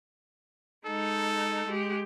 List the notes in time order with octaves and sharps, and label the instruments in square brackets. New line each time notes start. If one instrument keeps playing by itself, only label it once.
[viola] G#3 D#4 [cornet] A4
[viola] G#3 G4